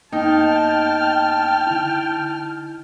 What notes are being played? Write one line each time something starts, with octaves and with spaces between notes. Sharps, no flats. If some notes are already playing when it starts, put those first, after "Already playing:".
F#2 A#3 B3 D#4 G5 A5 F6
D3 E4